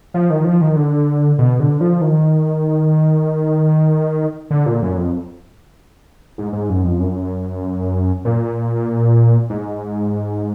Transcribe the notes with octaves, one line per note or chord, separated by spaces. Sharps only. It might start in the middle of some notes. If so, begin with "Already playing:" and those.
F3
D#3
F3
D#3
D3
B2
D3
F3
D#3
D3
A#2
F#2
F2
G#2
G#2
F#2
F2
F#2
A#2
G#2